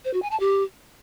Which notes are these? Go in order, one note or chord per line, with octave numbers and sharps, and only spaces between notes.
C5
F#4
G#5
A5
G4